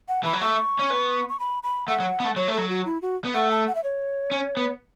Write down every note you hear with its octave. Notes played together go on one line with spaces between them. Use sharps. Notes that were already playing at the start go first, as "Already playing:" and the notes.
F#5
E3 B5
F#3
A3 C#6
C#4
B3
C#6
B5
B5
A3 F#5
F#3
B3
A3
F#3 C#5
A3
F#3 A4
F#4
E4
F#4
B3
A3 F#5
A5
F#5
E5
C#5
C#4
B3